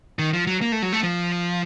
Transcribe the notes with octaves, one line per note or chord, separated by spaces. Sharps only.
D#3
F3
F#3
A#3
A3
F#3
A3
F3